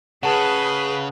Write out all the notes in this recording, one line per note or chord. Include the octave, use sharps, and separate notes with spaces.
C#3 G#4 B4 F#5 A5